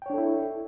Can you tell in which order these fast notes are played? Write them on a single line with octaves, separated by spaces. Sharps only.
G5 C#5 D4 A4 E4